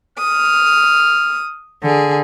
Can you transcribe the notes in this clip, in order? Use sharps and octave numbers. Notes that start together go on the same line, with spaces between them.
D#6 F6
D3 G#4